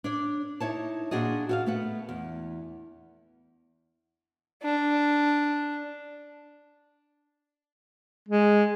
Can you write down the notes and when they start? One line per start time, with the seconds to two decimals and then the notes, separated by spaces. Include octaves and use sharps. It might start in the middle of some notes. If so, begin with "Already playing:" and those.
0.04 D4 C#5 D5
0.60 D#4 E4 C#5 A5
1.11 A#2 D4 F#4 G#4 D#5
1.49 F#4 E5 F5
1.66 A3 B3 F#5
2.09 E2
4.63 D4
8.29 G#3